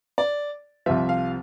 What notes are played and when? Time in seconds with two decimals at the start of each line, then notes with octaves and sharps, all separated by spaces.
0.18 D5
0.86 C2 C3 F3 E5
1.09 F5